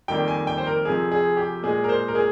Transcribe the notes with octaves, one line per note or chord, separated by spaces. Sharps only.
F2 D#3 G3 A#3 G5
G#5
G5
C5
A#4
F2 C3 F3 G#4
G#4
G4
A#2 G#3 G#4
A#4
C5
A#4
G#4